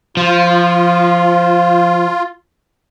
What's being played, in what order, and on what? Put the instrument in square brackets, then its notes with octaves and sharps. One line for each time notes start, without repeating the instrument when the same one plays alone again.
[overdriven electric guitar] F3 [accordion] F4